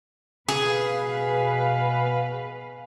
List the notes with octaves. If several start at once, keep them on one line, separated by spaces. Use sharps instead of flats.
B2 G#4 B4 F5